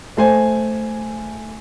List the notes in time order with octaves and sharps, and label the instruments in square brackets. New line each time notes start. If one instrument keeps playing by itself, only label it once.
[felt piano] A3 C5 G#5